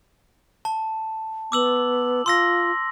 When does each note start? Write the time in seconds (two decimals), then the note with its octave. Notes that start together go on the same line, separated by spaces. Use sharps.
0.65 A5
1.52 B3 D6 E6 F#7
2.26 F4 C6 E6 A#6